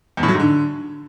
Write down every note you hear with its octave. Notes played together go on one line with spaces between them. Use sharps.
E2
A2
F#3
G#2
D3